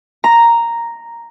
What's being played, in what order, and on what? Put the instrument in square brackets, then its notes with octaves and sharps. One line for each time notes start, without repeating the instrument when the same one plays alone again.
[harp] A#5